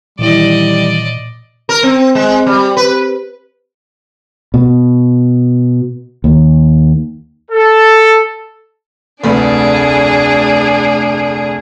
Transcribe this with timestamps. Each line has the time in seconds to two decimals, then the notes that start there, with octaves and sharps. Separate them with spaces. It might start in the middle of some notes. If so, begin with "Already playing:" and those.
0.19 A#2 D#3 E3 G3 E4 D5 D#5
1.69 A#4
1.83 C4
2.15 G#3
2.46 G3
2.77 B4
4.54 B2
6.24 D#2
7.50 A4
9.24 F1 D2 D4 G#4 B4